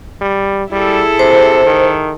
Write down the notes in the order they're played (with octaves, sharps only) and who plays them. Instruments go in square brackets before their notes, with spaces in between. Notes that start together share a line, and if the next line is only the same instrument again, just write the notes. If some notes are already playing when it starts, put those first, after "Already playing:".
[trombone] G3
[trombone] G3 [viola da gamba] E4 G#4 A4
[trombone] C3 [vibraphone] C5
[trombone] D#3